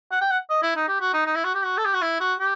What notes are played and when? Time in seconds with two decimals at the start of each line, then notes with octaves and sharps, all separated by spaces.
0.11 F#5
0.21 G5
0.31 F#5
0.50 D#5
0.63 E4
0.76 D#4
0.88 G4
1.00 F#4
1.13 D#4
1.26 D#4
1.35 E4
1.44 F#4
1.55 G4
1.64 F#4
1.78 A4
1.85 G4
1.94 F#4
2.02 E4
2.21 F#4
2.40 G4